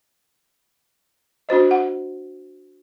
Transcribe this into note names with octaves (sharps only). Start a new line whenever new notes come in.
D4 F#4 C5 D#5
F#5